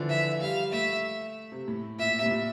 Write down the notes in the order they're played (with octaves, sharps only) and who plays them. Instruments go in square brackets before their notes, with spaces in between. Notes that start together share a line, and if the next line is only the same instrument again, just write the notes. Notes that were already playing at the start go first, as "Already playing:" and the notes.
Already playing: [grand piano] D3 E3 F3
[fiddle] E5
[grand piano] G3 [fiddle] F5
[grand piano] A3 [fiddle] E5
[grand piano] C3
A2
[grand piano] A#2 [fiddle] E5
[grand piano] A#2
C3
A2
A#2